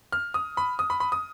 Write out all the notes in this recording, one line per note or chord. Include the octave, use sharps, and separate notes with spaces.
F6
D#6
B5
D#6
B5
B5
D#6